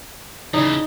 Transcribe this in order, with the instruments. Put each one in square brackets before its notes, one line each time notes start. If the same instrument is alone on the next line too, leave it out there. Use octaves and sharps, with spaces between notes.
[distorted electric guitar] C#3 E3 [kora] D#4